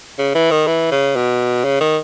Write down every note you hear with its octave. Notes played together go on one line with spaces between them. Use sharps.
C#3
E3
D#3
E3
C#3
B2
C#3
D#3